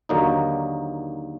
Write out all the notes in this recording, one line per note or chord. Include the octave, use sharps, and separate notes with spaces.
D#2 D3 F#3 A#3 D#4